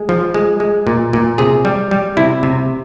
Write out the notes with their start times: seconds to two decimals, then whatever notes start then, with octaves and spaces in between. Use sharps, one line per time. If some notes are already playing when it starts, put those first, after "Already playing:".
Already playing: G#3 G#4
0.09 F3
0.34 G#3
0.60 G#3
0.87 A#2
1.13 A#2
1.38 C3 G#4
1.65 G3
1.91 G3
2.17 C3 E4
2.43 C3